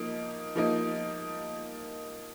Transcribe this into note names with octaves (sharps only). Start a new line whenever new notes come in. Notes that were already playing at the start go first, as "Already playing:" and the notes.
Already playing: F3 A#3 D#4
F3 A#3 D#4